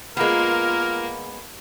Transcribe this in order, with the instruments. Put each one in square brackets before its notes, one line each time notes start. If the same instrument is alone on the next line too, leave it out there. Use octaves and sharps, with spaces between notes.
[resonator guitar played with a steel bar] G#3 B3 [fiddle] A#3 [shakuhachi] F4 [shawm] A#4